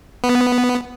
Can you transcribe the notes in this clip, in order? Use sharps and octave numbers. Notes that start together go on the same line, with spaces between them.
B3